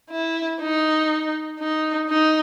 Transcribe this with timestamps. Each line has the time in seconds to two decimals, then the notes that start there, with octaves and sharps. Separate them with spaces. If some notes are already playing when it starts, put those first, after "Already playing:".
0.10 E4
0.60 D#4
1.60 D#4
2.10 D#4